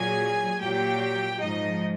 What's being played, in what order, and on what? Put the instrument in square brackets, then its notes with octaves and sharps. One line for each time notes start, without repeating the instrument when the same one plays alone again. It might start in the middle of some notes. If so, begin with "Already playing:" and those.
Already playing: [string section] A#2 F#3 G#4 G#5
A#2 F#3 G4 G5
G#2 F3 D#4 D#5